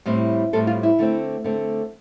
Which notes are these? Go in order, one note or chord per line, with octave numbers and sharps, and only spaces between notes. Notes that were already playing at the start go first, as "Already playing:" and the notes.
A2 G3 C4
A2 G3 C4 A4
F4
E4
D3 A3 C4
D3 A3 C4